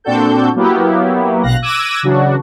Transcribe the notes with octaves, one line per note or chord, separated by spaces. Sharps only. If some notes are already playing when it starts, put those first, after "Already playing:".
A#2 C4 D4 F#4 A4 G6
F#3 A#3 B3 E4 G4
A#1 B2 F5 F#6 A#6
D6 E6 F#6 G#6 A#6 D#7
C#3 E3 F#3 D4 F#4